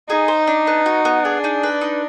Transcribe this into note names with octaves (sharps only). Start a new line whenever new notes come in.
D#4 G#4
C5
D4
B3
F#4
B3
D4 G#4
D#4
B4
D#4